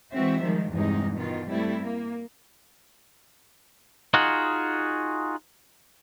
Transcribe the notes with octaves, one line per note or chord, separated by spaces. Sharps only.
E3 G#3 C4 F#4 C5 E5
D#3 F3 G3 G#3
E2 G2 C3 G#3 D#4
B2 D#3 F4
G3 A3 C4 E4
A#3
D#4 F4 F#4 G#4 F#5